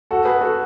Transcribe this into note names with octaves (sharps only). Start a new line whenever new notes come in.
F#4 A4
G#4 B4
F#4 A4